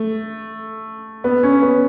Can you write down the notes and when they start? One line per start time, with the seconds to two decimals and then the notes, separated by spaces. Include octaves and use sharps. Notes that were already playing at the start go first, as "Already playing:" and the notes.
Already playing: A3
1.24 B3
1.43 C#4
1.62 B3